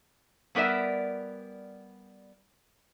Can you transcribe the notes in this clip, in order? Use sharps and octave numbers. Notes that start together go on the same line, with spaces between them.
G3 B3 A#4 D5 E5